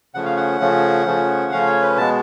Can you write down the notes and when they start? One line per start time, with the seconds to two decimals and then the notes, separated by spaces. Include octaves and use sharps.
0.14 C#3 F3 A3 C#4 F#5
0.25 F5
0.37 F#5
0.60 C#3 F3 A3 C#4
1.06 C#3 F3 A3 C#4
1.52 C#3 F3 A3 C#4 F5
1.66 C#5
1.82 B4
1.97 B2 G#3 B3 A5